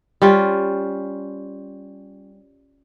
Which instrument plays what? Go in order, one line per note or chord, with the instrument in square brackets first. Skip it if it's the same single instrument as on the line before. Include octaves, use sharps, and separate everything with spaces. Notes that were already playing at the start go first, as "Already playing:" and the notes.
[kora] G3 C#4 F4